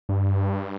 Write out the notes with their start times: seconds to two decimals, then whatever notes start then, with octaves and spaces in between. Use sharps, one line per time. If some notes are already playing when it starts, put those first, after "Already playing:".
0.09 G2